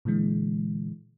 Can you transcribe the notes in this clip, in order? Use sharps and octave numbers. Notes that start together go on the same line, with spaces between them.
A#2 D3 E3 G#3